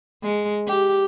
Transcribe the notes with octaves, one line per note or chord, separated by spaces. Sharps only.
G#3
G4